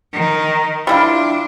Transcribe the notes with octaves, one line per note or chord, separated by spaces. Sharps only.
D#3
G3 D4 E4 F4